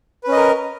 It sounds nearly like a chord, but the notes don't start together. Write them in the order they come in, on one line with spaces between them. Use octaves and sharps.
B4 C#4 D#5 A#4